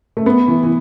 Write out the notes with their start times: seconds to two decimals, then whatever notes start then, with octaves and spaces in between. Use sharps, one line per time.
0.17 A3
0.26 B3
0.48 E3
0.63 E3